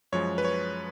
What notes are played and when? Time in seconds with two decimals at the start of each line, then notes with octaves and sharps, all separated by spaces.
0.12 F#2 F3 G#3 C#5
0.38 B4
0.45 C#5